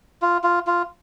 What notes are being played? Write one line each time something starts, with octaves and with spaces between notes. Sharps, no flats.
F4
F4
F4